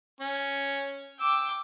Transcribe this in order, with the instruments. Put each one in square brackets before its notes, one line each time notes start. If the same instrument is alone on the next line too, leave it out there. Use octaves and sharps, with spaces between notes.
[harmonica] C#4
[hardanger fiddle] G5 D6 [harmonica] E6